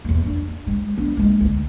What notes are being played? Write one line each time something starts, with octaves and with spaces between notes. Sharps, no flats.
E2 A#3
D4
G#3
B3 D4
G#3 A#3
D2